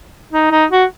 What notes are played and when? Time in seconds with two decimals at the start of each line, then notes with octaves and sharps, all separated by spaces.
0.33 D#4
0.51 D#4
0.71 F#4